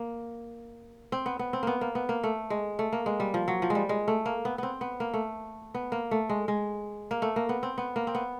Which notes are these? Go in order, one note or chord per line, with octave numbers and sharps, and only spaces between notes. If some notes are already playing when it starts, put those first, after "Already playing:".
Already playing: A#3
C4
B3
B3
C4
A#3 B3
A#3
B3
A#3
A3
G#3
A3
A#3
G#3
G3
F3
F#3
F3
G#3
G3
G#3
A3
A#3
B3
B3 C4
B3
A#3
A3
B3
A#3
A3
G#3
G#3
A#3
A3
A#3
B3
C4
B3
A#3
C4
B3